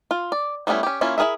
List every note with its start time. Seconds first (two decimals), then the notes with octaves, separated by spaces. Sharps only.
0.11 F4
0.32 D5
0.67 G3 A3 B3 C#4 E4
0.83 C#4 G4
1.01 A#3 C#4 E4 F4
1.18 E4 F4 G#4 A#4 E5